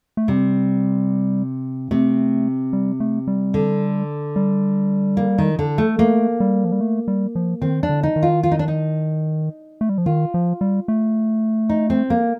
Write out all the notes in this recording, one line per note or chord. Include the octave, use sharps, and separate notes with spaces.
A3
C3 G3
C3 A3
G3
A3
G3
D3
G3
A#3
D#3
D3
A3
A3 A#3
G3
F3
G3
A3
G3
F3
D#3 C4
D4
D3
D#4
D#3
F4
F4
D#4
D4
D#4
A3
G3
F3
D#3 F4
F3
G3
A3
D#4
C4
A#3